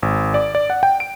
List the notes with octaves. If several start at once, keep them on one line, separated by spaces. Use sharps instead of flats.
G#1
D5
D5
F#5
G5
D7